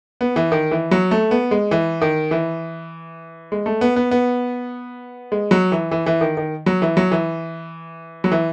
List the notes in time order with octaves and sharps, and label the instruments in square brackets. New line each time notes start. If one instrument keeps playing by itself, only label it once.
[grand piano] B3
E3
D#3
E3
F#3
A3
B3
G#3
E3
D#3
E3
G#3
A3
B3
B3
B3
G#3
F#3
E3
E3
E3
D#3
D#3
F#3
E3
F#3
E3
F#3
E3